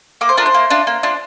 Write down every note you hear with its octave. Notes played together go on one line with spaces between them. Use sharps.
A#3 D6
C5
D4 F4 A#4
C5
A#3
D4 F4
A#3
D4 F4